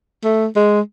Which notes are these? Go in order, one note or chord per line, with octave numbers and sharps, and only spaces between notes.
A3
G#3